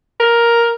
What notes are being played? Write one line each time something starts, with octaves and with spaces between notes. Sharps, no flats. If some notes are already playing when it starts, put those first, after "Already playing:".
A#4